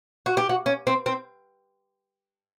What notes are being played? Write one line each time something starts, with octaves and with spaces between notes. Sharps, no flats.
F#4
G4
F#4
C#4
C4
C4